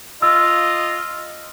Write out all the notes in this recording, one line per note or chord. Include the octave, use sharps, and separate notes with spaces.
F4 D#5 E6